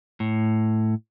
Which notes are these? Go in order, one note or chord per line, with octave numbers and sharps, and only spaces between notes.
A2